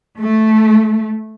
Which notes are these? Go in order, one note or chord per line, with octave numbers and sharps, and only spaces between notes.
A3